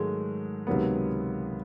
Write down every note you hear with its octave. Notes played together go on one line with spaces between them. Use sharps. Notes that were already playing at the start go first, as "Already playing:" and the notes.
Already playing: G#2 D#3 F#3 G#3 A3
C#2 C3 D#3 F#3 B3